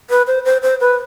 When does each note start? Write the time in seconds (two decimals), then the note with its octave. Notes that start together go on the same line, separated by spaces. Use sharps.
0.10 B4
0.27 C5
0.45 C5
0.63 C5
0.81 B4